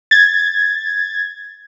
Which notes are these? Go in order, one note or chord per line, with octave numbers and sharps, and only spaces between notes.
G#6 A6